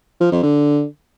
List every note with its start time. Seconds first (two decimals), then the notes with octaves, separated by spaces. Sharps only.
0.21 F3
0.32 F2
0.43 D3